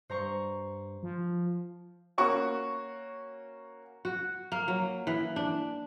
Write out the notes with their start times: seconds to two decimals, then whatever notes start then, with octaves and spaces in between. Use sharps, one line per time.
0.10 G2 C5 A#5 C#6
1.03 F3
2.18 A#3 C#4 F#4 C#6
4.05 F#4
4.52 A#3
4.68 F#3
5.07 E3
5.36 D4